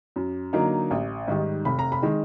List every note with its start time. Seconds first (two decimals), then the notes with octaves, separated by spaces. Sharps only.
0.16 F#2
0.53 D3 F#3 A#3 D#4
0.91 A1
1.28 G#2 D#3 G3
1.65 F1 B5
1.79 A#5
1.92 B5
2.02 D#3 G#3